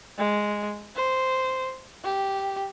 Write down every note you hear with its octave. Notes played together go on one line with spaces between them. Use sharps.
G#3
C5
G4